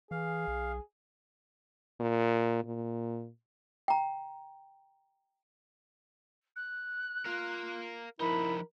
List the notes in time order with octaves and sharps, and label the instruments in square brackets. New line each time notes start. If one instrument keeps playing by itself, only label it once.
[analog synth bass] E3 [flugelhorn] G#4 [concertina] F5
[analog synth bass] B1
[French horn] A#2
A#2
[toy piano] G5 A#5
[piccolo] F#6
[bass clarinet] F4 [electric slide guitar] A#4 F5
[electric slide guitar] F3 D#4 [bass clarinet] E4 [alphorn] A#4 [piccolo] B5